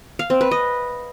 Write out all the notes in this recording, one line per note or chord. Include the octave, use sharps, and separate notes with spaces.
F5
C4
B4
D#5